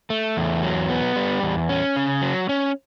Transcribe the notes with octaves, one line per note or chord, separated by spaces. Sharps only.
A3
E2
F#3
B3
G3
E2
C#4
C#3
F#3
C#4